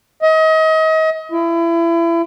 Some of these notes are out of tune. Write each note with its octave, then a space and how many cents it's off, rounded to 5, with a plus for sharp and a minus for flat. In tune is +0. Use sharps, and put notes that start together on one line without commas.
D#5 +35
E4 +30